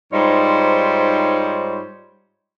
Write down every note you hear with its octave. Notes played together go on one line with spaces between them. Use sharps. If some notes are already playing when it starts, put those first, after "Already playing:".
G#2 G3 D#4 F4 C5 C#5